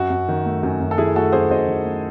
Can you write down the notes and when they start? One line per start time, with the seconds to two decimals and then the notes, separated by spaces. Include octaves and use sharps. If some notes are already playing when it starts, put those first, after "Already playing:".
Already playing: F#2 F#4
0.10 F#2
0.28 D#3
0.46 A3
0.63 F#2
0.80 F#2
0.91 A4
0.98 D#3 E4 G#4
1.16 A3 F#4 A4
1.32 F#2 G#4 C5
1.50 F#2 C5 D#5
1.68 D#3
1.85 A3